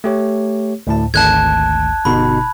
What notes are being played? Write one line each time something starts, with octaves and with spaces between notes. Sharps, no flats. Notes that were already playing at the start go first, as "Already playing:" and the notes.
A3 G4 C#5
D2 A2 A5
G#1 D2 A5 F#6 G#6
G1 B2 D#4 B5